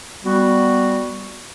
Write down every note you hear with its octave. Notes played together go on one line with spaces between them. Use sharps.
G3 B3 F#4